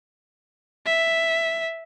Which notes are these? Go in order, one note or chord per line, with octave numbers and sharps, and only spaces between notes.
E5